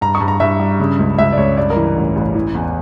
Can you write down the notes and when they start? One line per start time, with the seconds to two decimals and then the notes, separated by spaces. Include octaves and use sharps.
0.01 G2 A#5
0.15 C#6
0.21 G2
0.28 A#5
0.40 G2 E5
0.59 G3
0.80 C#3
0.99 C#2
1.18 C#2 E5
1.32 D5
1.37 C#2 C#5
1.57 G2 D5
1.70 A#4
1.76 E3
1.96 A1
2.16 A1
2.35 E3
2.55 E2